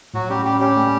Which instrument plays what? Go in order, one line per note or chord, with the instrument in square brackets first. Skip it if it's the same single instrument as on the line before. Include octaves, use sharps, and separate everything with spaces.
[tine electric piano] A2 [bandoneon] F#3 F#4
[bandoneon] G3 G4 [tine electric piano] C#4
[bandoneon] G3 G4 [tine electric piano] C#4
[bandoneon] G3 G4 [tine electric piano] C#4
[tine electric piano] A3